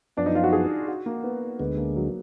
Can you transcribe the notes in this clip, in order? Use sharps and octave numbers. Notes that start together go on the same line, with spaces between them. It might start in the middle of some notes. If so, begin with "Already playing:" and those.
F#2 F3 B3 D4
D#4
F4
F#4
G#4
F#4
A#3
B3
D2 D3 G#3 B3
A#3
F#3